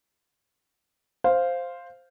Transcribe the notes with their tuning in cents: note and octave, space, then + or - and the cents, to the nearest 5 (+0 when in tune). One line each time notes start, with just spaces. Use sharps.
C5 +0 F5 +0